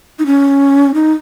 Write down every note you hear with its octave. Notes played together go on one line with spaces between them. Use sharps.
D#4
C#4
D#4